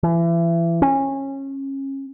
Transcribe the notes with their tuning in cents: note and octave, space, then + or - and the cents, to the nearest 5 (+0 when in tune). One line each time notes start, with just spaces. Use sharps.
E3 +30
C#4 -25